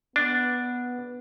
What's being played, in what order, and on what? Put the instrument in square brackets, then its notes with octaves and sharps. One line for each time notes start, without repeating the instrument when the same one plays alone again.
[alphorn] B3 [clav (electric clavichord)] D4